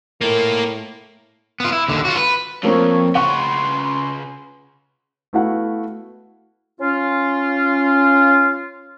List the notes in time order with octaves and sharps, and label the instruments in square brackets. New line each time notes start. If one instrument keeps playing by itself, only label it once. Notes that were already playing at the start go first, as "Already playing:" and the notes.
[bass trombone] A2 [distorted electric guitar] A#3 F4 [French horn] A#4
[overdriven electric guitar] B3 F4
E4
D#2 D3
F4 F#4
B4
[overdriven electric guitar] F2 [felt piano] F3 A#3 C4 [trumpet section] C#5
[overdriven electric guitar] C#3 B4 [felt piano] F#5 C#6 [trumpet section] C6
[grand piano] A3 B3 E4 F#4 F5 F#5
[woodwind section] C#4 F4